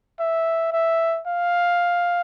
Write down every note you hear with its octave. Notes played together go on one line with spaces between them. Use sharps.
E5
E5
F5